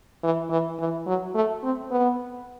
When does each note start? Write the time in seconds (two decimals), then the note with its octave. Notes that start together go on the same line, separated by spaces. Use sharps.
0.23 E3
0.50 E3
0.80 E3
1.07 F#3
1.35 A3
1.63 C4
1.91 B3